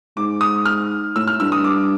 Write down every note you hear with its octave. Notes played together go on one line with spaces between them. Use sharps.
G#2 D6
D#6
F6
A2 E6
F6
G2 E6
D#6
D6